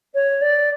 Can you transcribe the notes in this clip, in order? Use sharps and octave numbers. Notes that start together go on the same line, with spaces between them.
C#5
D5